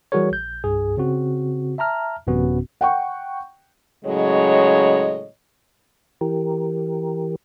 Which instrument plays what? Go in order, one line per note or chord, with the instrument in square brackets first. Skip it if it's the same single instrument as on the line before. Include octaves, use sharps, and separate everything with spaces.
[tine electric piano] E3 G3 F#4 G#4 A#4 C#5
A#1 G6
C2 G2 G#4
C#3 C4 F#4
E5 A5 A#5 F6
A1 F#2 C3 B3 C#4 F#4
[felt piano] F#5 G5 C#6
[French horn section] A2 C#3 F#3 G#3 C#5 D#5
[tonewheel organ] E3 G4 A#4